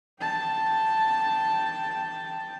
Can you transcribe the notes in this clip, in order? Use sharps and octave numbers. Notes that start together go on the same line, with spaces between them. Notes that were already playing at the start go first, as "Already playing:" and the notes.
G5 A5